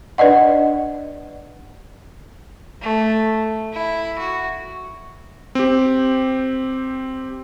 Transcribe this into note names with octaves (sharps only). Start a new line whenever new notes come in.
D4 B4 D5 D#5 F#5
A3
E4
F#4
C4 G4